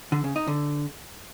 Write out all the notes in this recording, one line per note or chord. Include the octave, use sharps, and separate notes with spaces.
D3
C#3
D#4
D3